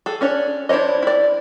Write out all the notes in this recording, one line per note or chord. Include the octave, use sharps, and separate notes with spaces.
G#4 A4
C#4 D4 C#5
D4 E4 C5 C#5 D#5
E4 D5